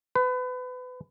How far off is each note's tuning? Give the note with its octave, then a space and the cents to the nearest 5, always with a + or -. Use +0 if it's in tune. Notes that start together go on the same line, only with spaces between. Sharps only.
B4 +30